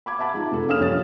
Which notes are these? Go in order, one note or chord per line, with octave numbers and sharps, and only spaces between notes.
B5 D6 G#6
E5 F#5 A5 B5 D6
G#3 D#4 F4
F1 A4
A#3 C#4 F5 D#6 F6 E7
F1 A#1 F#2 G3 C#5 A6